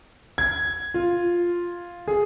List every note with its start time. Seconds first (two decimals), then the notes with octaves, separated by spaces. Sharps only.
0.38 G#6
0.94 F4
2.08 G#4